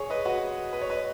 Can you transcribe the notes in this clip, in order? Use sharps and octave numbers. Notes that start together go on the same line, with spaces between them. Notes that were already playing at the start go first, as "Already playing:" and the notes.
Already playing: G#4 C#5
B4 D#5
F#4 B4
B4
C#5
B4 D#5